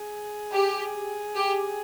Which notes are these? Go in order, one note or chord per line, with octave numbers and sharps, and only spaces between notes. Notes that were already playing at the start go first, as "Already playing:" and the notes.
Already playing: G#4
G4
G4